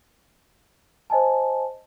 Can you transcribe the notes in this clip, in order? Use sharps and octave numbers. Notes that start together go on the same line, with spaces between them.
C5 D#5 G#5 A5